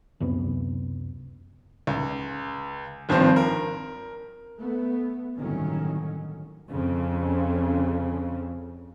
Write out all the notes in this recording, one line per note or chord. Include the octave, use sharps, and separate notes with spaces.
C#2 F#2 C3 B3
C#2
G#1 G2 F3 C4
A#4
A3 B3
G1 C2 A2 D#3 F#3 C#4
F2 C#3